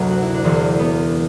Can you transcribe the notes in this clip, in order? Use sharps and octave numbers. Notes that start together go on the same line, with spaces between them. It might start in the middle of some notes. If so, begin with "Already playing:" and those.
Already playing: F#1 D2 C3 F#3 A3
F#4
E4
D4
E1 E2 D3 C4
B3